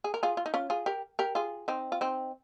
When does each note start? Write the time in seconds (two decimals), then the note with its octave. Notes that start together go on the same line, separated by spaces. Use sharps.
0.04 G#4
0.14 A#4
0.23 F4 G#4
0.37 F4
0.46 D#4
0.54 C#4 F4
0.70 F4 G#4
0.86 G4 A#4
1.19 G4 A#4
1.35 F4 G#4
1.68 C4 D#4
1.92 F4
2.01 C4 D#4